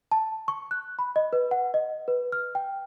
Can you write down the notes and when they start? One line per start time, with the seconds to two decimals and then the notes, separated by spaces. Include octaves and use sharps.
0.12 A5
0.48 C#6
0.71 F#6
0.99 B5
1.16 D#5
1.33 B4
1.51 F#5
1.74 D#5
2.08 B4
2.32 F6
2.55 G5